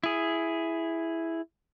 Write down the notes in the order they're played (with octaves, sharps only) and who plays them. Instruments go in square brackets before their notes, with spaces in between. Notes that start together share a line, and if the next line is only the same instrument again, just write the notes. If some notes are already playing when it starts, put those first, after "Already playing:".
[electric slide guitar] E4 G#4